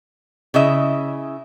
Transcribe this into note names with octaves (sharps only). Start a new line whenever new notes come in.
C#3 E4 D#5 E5